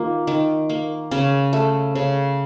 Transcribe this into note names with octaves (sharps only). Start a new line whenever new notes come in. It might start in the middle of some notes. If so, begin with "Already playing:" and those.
Already playing: D#3 A#3 F4
D#3
A#3
C#3 C#4
A3
C#3